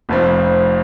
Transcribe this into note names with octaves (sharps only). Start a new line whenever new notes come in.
F1 F2 F3